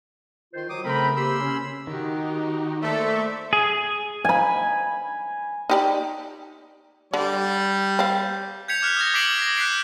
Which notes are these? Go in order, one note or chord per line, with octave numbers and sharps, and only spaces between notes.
D#3 F4 C5
F#3 D6 D#6
C#3 A3 C4 A#4 G5 B5
A#3 G4 B5 C6 E6
C#4
D#3 D#4 F#4 G4
A3 A#3 A4 C5 D5 E5
G#4
G#5 B5
D#4 G4 D5
D3 G3 D5
C4 F5
G6 G#6 B6 C#7 F7
D6 F6 F#6 C#7
D#6 G#6 A#6
D6 B6 C7 D7 F#7
A#6 F#7
F#6 G6 B6 C7 D7